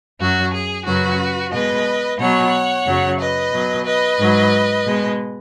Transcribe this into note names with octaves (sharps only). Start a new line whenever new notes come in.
F#2 F#3 F#4
G#4
F#2 C#3 F#3 F#4 B4
B2 G#3 B4 D#5
B2 F#3 C#5 F#5
F#2 C#3 F#3
B4 D#5
B2 F#3
B4 D#5
G#2 F#3
B2 G#3